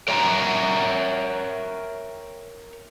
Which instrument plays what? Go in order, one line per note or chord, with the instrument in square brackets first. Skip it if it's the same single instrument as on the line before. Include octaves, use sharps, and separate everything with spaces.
[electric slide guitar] A#4 C#5 E5 G5 G#5 A#5